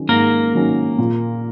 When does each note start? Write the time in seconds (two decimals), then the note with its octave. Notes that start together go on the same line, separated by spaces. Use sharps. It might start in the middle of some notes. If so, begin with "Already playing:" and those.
Already playing: D#3 F#3 C#4
0.09 G#2 A#3 A#4
0.54 D#3 F#3 C#4
0.99 A#2